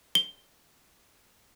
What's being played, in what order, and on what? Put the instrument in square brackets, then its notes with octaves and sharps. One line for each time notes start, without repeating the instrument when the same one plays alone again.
[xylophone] G7